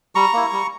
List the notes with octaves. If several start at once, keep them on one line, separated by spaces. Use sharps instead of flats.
G3 A#5 C#6
A#3 E4
G3